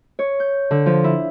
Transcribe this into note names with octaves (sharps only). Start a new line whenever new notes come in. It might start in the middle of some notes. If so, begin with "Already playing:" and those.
C#5
G6
D3
F3
E4